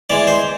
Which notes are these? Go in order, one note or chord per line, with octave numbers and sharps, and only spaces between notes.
E3 G#3 D5
C5